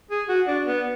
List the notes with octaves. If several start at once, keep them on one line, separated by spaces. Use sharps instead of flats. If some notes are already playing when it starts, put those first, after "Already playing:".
G#4
F#4
D4
B3